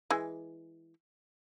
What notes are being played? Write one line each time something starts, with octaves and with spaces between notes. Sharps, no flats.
E3 G#3